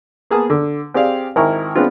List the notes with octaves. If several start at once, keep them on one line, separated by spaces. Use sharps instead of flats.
A#3 B3 G#4 A5 D#6
D3
C4 G4 G#4 D5 F5
G#1 E4 A#4 G#5 C#6
G#3 B3 C4 D4 F4